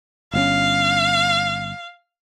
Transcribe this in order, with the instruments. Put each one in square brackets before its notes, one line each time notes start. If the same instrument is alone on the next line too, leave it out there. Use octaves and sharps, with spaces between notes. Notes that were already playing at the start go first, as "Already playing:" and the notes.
[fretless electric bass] G1 B2 C#4 [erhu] F5